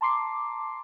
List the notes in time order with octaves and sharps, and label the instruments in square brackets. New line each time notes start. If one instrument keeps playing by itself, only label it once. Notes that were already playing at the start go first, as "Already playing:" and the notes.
[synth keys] A5 A#5 C6 D6 C7